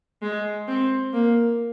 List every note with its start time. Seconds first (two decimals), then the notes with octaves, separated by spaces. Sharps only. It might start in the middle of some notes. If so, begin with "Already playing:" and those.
0.22 G#3
0.68 C4
1.14 A#3